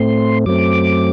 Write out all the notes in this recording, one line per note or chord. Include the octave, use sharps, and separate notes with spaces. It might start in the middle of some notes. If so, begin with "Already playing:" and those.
Already playing: A2 A3 C4 C6
F#2 F#3 A3 C4 D6